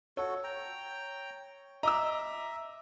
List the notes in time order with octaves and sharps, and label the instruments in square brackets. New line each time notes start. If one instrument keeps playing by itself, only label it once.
[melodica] F#4 A4 [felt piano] C#5
[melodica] G5 A#5
[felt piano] D#5 E6 [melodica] E5 [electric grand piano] A#5 D6